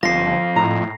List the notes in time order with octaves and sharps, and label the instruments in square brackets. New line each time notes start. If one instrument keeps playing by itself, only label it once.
[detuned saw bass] G1 [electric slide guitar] F2 F4 [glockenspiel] A#6 C7
[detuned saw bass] A2 [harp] A#5